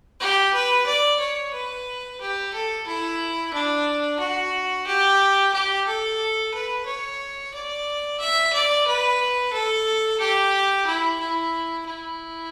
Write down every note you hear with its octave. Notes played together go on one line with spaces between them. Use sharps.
G4
B4
D5
C#5
B4
G4
A4
E4
D4
F#4
G4
G4
A4
B4
C#5
D5
E5
D5
B4
A4
G4
E4
E4
E4